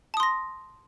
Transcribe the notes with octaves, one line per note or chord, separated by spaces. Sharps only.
A5 C6 D#6 A#6